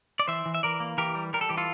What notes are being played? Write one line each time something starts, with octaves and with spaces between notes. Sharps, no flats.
D5
E3 C5 E5
E3
E5
E3 A#4 D5
A#3
E3 G4 A#4
G3
G3 A#4
A4
E3 G4
F4 A4